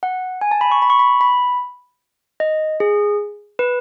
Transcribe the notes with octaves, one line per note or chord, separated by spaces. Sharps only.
F#5
G#5
A5
B5
C#6
B5
C#6
B5
B5
D#5
G#4
B4